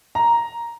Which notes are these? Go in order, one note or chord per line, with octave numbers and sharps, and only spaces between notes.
A#5